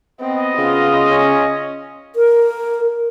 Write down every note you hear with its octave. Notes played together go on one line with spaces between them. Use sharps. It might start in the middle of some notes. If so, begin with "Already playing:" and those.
B3 C4 D#5
C#3 F4
C#4
A#4